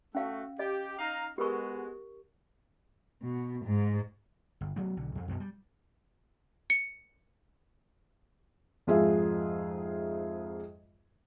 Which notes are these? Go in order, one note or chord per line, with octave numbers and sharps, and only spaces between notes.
A3 C#4 F#4 F5
G4 D#5
D#4 F5 A#5
G#3 B3 F#4 G4 A#4 C#6
B2
G#2
G1
F#3 A3 B3
B1 D3
F2
F#2 B2 A3 A#3
G3
C#7
F2 G#2 F4 G#4 E5